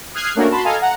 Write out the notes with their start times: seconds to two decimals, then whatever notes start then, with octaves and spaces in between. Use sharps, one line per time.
0.14 D#6 F6 F#6 G#6 C7
0.35 A3 A#3 C#4 D4 F#4 A#4
0.50 F#4 A5 B5 C6
0.64 A4 D#5 F5 G#5 A#5
0.81 F#5 A#5